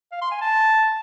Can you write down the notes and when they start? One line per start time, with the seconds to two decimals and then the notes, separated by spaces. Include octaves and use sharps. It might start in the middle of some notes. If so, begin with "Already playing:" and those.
0.12 F5
0.22 C6
0.31 G#5
0.41 A5